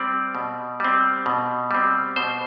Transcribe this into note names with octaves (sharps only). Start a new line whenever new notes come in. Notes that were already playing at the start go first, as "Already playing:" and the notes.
Already playing: G3 C4 D5
B2
G3 C4
B2
G3 C4
B2 C5